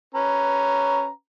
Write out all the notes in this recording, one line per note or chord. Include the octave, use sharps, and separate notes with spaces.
C#4 B4 A#5